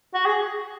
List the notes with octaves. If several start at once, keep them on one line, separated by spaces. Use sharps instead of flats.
F#4
G#4